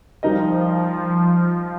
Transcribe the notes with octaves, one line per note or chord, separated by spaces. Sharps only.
F3 G3 D#4 A#4 D#5